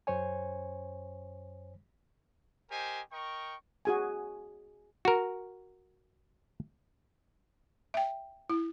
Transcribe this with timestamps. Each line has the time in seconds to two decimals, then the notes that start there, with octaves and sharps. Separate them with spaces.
0.07 F#2 C5 C#5 G#5
2.71 G4 A#4 C5 D#5 G#5
3.12 A#4 D#5 G5 C#6
3.85 F#4 G#4 G#5
5.05 F#4 A#4
7.94 E5 G5
8.50 E4